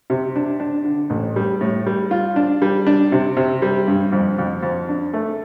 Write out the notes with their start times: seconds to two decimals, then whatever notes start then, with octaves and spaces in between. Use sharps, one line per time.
0.10 C3
0.36 D4
0.60 D4
0.85 D3
1.10 A1
1.36 G3
1.61 A2
1.86 G3
2.11 F4
2.36 D4
2.62 G3
2.87 D4
3.12 C3
3.37 C3
3.62 G3
3.88 G2
4.12 F2
4.38 F2
4.63 F2
4.89 D4
5.14 A3